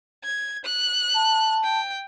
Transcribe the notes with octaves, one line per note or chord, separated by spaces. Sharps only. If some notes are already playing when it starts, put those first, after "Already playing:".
G#6
F#6
A5
G5